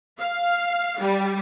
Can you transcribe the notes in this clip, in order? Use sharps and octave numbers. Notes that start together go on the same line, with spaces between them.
F5
G3